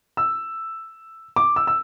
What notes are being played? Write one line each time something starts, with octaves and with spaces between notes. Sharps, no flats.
E6
D6
E6
E6